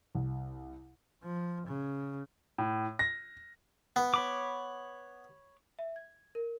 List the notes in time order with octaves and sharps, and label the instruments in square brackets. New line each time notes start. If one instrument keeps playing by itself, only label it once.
[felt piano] C2
[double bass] F3
C#3
[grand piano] A2
A#6
[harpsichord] B3
[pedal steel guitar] C#5 B5 D6
[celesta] E5
G#6
A#4